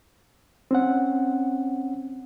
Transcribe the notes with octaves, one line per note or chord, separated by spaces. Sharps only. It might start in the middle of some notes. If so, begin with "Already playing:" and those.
C4 C#4 F#5